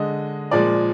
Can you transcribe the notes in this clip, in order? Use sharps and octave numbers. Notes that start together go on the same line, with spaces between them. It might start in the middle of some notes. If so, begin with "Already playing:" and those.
Already playing: D3 G#3 D#5
A#2 F3 G#3 D5